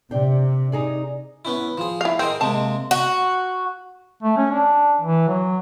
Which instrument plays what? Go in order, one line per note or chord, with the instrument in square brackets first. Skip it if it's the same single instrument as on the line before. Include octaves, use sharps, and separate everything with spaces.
[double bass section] C3 [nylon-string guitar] D4 G5
[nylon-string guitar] D#4 G#4 D5
[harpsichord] B3 C#4 E4
F3 G#4
[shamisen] E4 F5
[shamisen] C4 [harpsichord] G#4 A#4 D#5
[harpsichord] C3 G#3 A#3 [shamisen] A5
[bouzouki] F#4
[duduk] A3
C#4
D4
E3
F#3